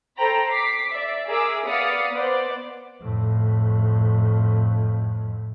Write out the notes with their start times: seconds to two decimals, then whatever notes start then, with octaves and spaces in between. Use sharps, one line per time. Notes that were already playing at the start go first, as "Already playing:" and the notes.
0.16 A4 C5 G5 A#5 B5
0.48 D6 B6 C7
0.91 D5 E5
1.27 G#4 A#4 E5 D6 E6
1.65 B3 D5 F5 D#6 B6 C#7
2.10 B3 C5 D5
3.02 F2 A2